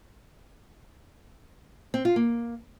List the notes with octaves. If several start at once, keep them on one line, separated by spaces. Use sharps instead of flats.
C4
F4
A#3